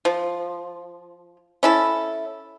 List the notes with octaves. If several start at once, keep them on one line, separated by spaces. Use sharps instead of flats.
F3
C#4 E4 A4